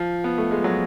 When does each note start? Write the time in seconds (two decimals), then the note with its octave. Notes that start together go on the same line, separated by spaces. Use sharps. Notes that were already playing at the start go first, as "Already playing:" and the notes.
Already playing: F3
0.24 B3
0.38 A3
0.51 G#3
0.64 F#3